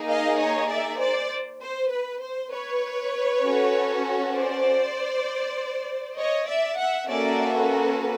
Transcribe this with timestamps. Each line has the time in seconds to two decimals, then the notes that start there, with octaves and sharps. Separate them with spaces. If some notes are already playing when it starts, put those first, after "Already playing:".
Already playing: A#3 D#4 G#4
0.09 D#5 F5
0.39 C#5 D#5
0.70 D5 E5
1.00 C5 D5
1.62 C5
1.91 B4
2.22 C5
2.52 B4 C#5
3.43 C#4 F#4 A4
4.35 C5 D5
6.17 C#5 D#5
6.48 D5 E5
6.79 E5 F#5
7.09 A#3 C#4 F#4 A4 D5 E5
7.55 B4